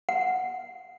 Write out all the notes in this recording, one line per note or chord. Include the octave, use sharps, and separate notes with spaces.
F#5